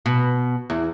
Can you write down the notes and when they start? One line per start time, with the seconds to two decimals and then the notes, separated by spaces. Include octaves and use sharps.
0.06 B2
0.70 E2